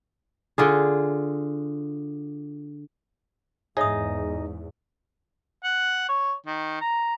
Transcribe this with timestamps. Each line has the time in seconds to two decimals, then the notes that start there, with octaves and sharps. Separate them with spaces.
0.58 D3 F4 G#4
3.77 E2 G#2 D#4 G#4 C#5 D#5 E5 D#6
5.64 F#5
6.09 C#5
6.46 D#3
6.81 A#5